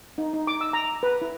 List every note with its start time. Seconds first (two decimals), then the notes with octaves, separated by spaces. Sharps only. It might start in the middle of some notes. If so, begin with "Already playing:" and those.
0.18 D#4
0.33 D#4
0.47 D6
0.61 E6
0.73 A#5
1.03 B4
1.22 E4